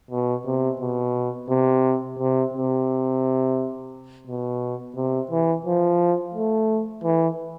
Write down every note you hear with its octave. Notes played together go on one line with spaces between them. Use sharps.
B2
C3
B2
C3
C3
C3
B2
C3
E3
F3
A3
E3